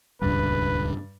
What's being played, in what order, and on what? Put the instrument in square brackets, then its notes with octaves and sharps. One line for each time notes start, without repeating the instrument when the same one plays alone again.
[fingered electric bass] D#1 C#2 [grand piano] G2 [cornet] B4